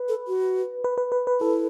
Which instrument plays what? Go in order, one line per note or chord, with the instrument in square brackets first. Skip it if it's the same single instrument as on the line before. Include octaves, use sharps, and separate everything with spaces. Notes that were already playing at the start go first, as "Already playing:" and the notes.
Already playing: [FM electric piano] B4
[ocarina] A4
F#4
[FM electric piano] B4
B4
B4
B4
[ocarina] E4 [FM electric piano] A4